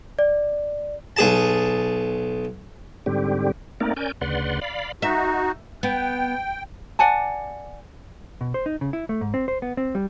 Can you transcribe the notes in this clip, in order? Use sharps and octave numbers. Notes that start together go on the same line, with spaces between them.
D5
B1 G#4 A5
G#2 D3 G3 C4 G4
A3 A#3 C4 D#4 A#4 D5
C#4 A#4 D5 G#5 G6
D2 C#3 B4 D5 F#5 C6
D5 F5 B5
D#4 F#4 E5
B3 G5
D5 F#5 G#5 A5
B2
C5
D#4
C#3
E4
A3
G#2
C4
C5
B3
C4
G3